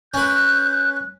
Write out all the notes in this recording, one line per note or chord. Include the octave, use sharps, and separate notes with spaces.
C#4 B4 F#6 G6